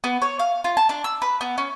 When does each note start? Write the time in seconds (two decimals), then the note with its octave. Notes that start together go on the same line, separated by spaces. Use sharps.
0.04 B3
0.22 C#5
0.39 F5
0.64 F4
0.77 A5
0.89 D4
1.04 E6
1.22 B4
1.41 B3
1.58 C#4